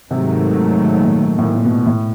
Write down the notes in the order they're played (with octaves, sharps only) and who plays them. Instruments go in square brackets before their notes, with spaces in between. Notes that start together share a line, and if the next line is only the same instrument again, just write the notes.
[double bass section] G#2 D#3 F#3 A3 [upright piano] C3
[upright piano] A#2
A2
A#2
A#2
B2
A2